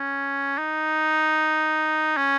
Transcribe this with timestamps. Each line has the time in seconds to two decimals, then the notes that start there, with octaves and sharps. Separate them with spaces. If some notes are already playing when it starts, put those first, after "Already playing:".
Already playing: C#4
0.58 D#4
2.17 C#4